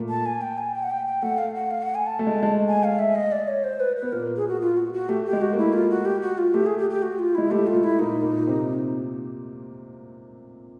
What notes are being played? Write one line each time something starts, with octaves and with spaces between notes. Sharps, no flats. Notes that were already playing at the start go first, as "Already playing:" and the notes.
Already playing: A#2 A3 A#3
A5
G#5
G5
G#5
G5
F#5
G5
G5
A3 F#5
F5
F#5
F5
F#5
G#5
A5
A3
G#3
G#3
G#5
F5
E5
D#5
D5
C#5
C5
B4
B4
B3
A#2 A#3 A#4
G#4
F#4
F4
F#4
F#4
A3 G4
G4
G#3
F#4
A#3
A3 E4
F4
F#4
G4
F#4
F4
A3 G4
G#4
G4
G4
F#4
F4
G#3 E4
A3 G4
F4
A3
E4
A#2 A#3 D#4
A#2 A#3
C3 C4